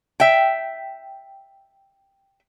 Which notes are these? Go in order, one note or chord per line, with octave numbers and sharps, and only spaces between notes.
E5 G5